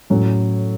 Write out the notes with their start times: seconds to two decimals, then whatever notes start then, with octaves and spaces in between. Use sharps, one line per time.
0.10 A2 F#3 C#4